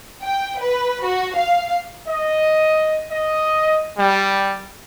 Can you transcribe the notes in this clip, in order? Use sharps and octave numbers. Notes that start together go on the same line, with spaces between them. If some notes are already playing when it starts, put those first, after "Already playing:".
G5
B4
F#4
F5
D#5
D#5
G3